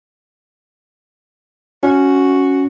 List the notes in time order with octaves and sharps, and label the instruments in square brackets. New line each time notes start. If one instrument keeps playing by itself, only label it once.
[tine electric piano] C#4 [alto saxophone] F#4